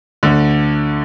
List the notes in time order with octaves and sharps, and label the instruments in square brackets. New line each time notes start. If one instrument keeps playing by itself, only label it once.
[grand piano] D2 D3